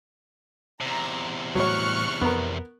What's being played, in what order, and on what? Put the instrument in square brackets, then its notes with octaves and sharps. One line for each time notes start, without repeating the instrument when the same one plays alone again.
[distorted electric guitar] E2 C3 [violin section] A#5
[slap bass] A2 E3 G3 [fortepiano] F#3 C#5 [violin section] C#6 F6 F#6
[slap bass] F2 [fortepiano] B3 A#4